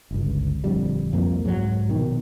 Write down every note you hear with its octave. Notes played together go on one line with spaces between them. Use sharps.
G1 C#2
D#1 F2 D3 G3
C2 F2 A#3 C4
C2 G#2 F3 F#3
A#1 B2 D#3